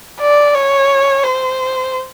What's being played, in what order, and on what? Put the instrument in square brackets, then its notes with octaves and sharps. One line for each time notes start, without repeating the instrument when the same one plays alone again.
[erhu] D5
C#5
C5